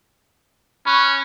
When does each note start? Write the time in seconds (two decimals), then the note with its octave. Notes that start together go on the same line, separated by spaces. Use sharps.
0.86 C#4 B5 C#6 F#6